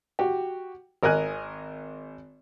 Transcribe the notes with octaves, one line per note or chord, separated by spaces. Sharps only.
F#4 G4
G#1 A#4 D#5 G#5 F#6